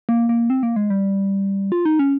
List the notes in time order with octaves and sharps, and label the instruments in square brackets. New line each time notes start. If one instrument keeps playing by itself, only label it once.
[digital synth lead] A#3
A#3
C4
A#3
G#3
G3
F4
D#4
C#4